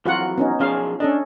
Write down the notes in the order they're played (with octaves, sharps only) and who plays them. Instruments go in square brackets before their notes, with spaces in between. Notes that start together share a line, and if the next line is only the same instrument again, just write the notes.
[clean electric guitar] F2 E3 F#3 [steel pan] F4 F#4 F#5
[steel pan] B3 C#4 D#4
[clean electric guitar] B1 F3 G#4 [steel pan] C#4 F5
[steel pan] C#4 A4 D#5 [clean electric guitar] D4